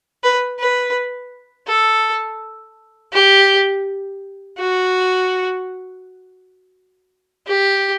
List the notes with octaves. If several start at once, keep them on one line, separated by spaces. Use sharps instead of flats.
B4
B4
A4
G4
F#4
G4